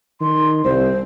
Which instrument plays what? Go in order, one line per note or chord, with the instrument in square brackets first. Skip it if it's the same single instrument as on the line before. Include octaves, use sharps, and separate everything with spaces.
[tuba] D#3 [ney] C6
[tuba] C2 [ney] C5